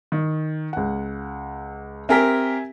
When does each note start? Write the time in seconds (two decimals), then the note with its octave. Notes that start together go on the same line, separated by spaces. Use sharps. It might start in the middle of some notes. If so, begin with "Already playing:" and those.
0.12 D#3
0.73 C#2 F#5
2.09 C4 G4 A#4 E5 G#5 B6